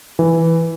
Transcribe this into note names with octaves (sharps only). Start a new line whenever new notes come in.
E3